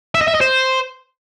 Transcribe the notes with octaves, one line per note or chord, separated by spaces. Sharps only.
E5
D#5
E5
D#5
C5